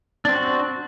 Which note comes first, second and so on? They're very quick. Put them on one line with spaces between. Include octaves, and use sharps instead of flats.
D4 C4 F#4